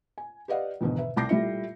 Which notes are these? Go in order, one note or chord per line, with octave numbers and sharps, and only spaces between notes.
G#5
G4 B4 D5 D#5 F5 F#5
E2 G#2 B2 D3 D#3
B4 E5
C2 A5 D6 G6 A#6 C7
A#2 G3 A3 E4 E5 C#7